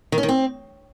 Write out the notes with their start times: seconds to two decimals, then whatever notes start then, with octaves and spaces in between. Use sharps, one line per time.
0.12 D#3
0.18 C#4
0.23 D#3
0.28 C4